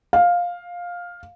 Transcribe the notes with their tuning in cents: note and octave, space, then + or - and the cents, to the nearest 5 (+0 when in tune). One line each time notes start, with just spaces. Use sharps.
F5 +10